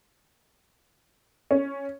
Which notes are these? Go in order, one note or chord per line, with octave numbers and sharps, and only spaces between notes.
C#4